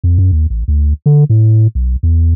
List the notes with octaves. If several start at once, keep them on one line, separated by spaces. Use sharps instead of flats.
F2
F#2
D#2
A1
D2
D3
A2
B1
E2